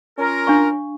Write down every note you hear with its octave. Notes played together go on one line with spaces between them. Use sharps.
C#4 F4 A#4
D4 F5 C#6